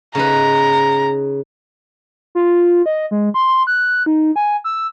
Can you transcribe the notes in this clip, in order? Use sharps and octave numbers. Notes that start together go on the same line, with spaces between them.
C#3 D#4 B4 A#5
F4
D#5
G#3
C6
F#6
D#4
G#5
E6